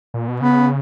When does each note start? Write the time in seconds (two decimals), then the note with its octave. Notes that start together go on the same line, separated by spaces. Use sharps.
0.14 A#2
0.28 B2
0.40 C#3 B3